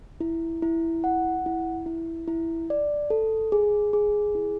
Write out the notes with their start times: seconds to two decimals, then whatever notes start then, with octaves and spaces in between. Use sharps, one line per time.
0.20 E4
0.62 E4
1.04 F#5
1.46 E4
1.86 E4
2.28 E4
2.70 D5
3.10 A4
3.52 G#4
3.93 G#4
4.35 E4